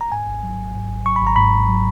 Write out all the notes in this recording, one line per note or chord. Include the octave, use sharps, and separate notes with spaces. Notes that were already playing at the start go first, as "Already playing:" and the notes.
A#5
G#2 G#5
G#1
F#3
G#1
G#2
G#1
F#3 C#6
G#1 B5
A#5
G#2 B5
G#1
F#3